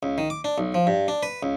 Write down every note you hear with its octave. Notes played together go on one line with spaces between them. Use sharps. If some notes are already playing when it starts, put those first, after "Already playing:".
C#2
D#3
D6
D4
B1
F3
G2
D4
B4
C#2